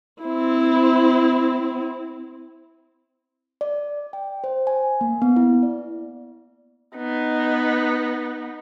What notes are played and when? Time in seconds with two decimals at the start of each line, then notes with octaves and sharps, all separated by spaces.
0.23 C4 E4
3.61 D5
4.13 G5
4.44 C5
4.67 G#5
5.01 A#3
5.22 B3
5.36 E4
5.63 D5
6.96 B3 D#4